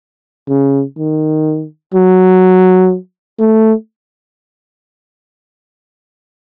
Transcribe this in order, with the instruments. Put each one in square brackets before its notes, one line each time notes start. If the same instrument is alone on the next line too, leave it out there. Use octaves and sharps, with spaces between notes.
[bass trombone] C#3
D#3
F#3
A3